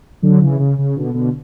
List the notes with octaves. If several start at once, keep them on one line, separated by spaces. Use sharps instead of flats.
D3 F#3
C#3 E3
C#3
C#3
B2 D3
B2 D3